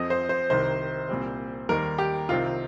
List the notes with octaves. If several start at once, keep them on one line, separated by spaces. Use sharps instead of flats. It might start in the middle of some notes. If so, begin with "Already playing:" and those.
Already playing: F2 F3 C4 D#5
C5
C5
C2 C3 D#3 C5
C2 A#2 G3 C4
D#2 D#3 G3 A#3 A#4
G4
C2 C3 D#3 C4 F4